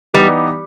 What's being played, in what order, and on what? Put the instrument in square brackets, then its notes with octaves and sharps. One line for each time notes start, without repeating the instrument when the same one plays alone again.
[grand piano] E3 B3 D#4 G4 [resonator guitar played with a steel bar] G3